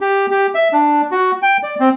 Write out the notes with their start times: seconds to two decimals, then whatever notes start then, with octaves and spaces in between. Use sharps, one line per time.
0.01 G4
0.31 G4
0.55 E5
0.73 D4
1.11 F#4
1.42 G5
1.63 D5
1.80 C4